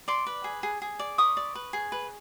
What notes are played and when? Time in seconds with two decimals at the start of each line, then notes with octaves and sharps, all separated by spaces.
0.08 D5 C6 D6
0.26 B4
0.44 G#4
0.63 G#4
0.82 G#4
0.99 D5
1.18 B4 C#6 D#6
1.37 D5
1.55 B4
1.73 G#4
1.92 B4